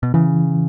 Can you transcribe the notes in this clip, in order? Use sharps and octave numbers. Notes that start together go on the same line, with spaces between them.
B2
C#3 E3